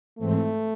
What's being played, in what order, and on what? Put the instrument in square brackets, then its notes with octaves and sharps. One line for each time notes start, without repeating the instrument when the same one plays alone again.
[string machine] G#2 E3 C4 [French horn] A3